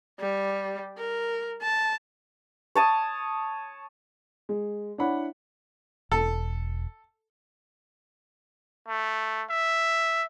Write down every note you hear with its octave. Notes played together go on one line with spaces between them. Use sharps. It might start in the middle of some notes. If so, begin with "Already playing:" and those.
G3
A#4
A5
C#5 A5 D#6
G#3
D4 E4 C#5 F#5 B5
E1 A4
A3
E5